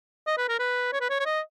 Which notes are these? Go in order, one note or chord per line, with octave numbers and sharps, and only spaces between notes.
D#5
B4
A#4
B4
C#5
B4
C#5
C#5
D#5